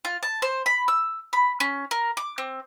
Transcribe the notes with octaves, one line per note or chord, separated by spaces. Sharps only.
F4
A5
C5
B5
E6
B5
C#4
A#4
D6
C4